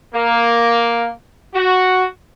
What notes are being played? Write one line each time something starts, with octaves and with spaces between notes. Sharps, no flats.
A#3
F#4